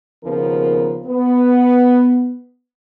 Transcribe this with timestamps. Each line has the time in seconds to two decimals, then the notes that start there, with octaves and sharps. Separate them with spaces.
0.24 D#2 C#3 F3 B3 A#4
1.07 B3